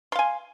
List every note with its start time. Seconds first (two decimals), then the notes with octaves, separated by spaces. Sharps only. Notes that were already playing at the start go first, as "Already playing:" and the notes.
0.12 C6
0.15 F5
0.19 G#5